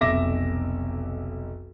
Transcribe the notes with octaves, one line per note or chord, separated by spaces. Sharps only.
F1 B1 E5 D6 A#6